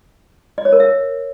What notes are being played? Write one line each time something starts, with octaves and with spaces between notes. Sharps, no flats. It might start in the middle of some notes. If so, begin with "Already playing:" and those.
D#5
C#5
A#4
E5